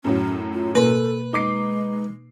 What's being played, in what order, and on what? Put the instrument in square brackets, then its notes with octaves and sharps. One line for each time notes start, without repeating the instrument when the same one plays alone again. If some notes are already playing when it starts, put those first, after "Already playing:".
[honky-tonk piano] F#2 A2 F#3 [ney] C#4
[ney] F4
[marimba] B2 A#3 [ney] A4 [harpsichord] B4
[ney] G#3 [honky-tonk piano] D#4 D6 C7